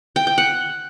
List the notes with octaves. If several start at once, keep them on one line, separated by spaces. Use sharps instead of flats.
G5
G5
F#5